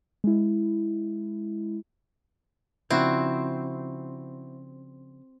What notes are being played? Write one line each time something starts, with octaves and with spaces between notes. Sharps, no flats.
G#3 E4
C#3 F3 C4 D4 E4 F#4